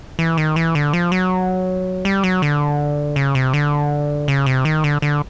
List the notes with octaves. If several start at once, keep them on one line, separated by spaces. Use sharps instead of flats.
E3
D#3
E3
D3
F3
F#3
G3
F#3
D3
C#3
C3
D3
C#3
C3
D#3
D3
D3